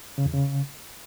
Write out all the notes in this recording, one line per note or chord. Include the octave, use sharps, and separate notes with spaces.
C#3
E2
C#3